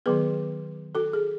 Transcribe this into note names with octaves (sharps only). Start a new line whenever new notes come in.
D#3 F#3 B3 G#4 B4
F#4 A4
G#4